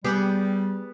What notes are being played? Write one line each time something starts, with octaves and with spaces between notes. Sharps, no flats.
G3 B3 G4 G#4